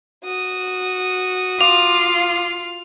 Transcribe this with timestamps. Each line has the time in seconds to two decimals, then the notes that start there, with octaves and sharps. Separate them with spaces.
0.24 F#4 D#6
1.61 F4 F5 D6 F7